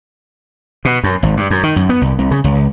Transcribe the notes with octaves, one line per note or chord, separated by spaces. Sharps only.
B2
F#2
G#1
G2
F#2
D#3
F#2
B3
C2
C2
C#3
C#2